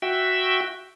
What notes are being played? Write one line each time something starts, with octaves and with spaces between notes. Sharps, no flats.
F#4 E5 G5